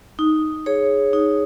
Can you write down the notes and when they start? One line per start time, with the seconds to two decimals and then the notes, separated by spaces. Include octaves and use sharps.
0.19 D#4
0.66 G#4 C#5
1.13 D#4